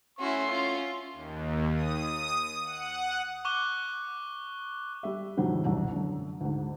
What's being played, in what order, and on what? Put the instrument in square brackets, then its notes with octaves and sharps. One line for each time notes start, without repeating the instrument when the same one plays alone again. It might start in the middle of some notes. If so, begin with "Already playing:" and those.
[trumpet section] A3 C6 [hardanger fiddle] C#4 [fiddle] E4 F#4
[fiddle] C#4 [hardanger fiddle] F4
[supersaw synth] D#2
D#6
F#5
[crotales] C#6 D6 F#6 G7
[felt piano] G3 E5
F2 G#2 C3 D#3 F#3 G3
E1 C2 F#2
F#2 D3
D2 G#2